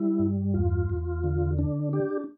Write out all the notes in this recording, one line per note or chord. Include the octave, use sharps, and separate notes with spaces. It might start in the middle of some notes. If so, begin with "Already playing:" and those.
Already playing: G3 E4
G2
E2 F4
E2
D3
D4
D4 G4